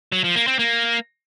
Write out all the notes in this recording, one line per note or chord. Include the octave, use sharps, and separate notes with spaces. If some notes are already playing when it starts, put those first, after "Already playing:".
F#3
F3
A#3
C4
A#3